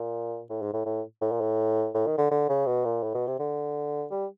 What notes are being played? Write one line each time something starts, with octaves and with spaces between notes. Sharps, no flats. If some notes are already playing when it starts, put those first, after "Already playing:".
Already playing: A#2
A2
G#2
A2
A2
A2
A#2
A2
A2
D#3
D3
D3
C#3
B2
A#2
A2
B2
C3
D3
G3